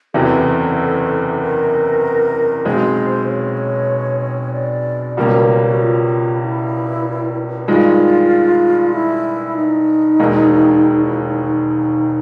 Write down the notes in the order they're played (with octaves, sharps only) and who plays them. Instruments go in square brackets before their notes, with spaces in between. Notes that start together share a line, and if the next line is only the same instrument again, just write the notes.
[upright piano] F#1 E2 C3 E3 [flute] A4
[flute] A#4
[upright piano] B1 B2 G#3 C4 [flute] C5
[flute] C#5
D5
[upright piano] C#2 B2 G3 A#3 C#4 [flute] C#5
[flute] C5
F#4
F4
E4
[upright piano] G2 D#3 G#3 [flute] F4
[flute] E4
D#4
[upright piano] E1 D#2 D#3 G#3
[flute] D#4
E4
D#4
D#4